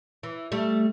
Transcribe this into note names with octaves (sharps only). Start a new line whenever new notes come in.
E3
G3 A3